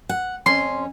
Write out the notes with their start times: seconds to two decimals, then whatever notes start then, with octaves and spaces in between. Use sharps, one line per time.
0.09 F#5
0.46 F2 C#4 C6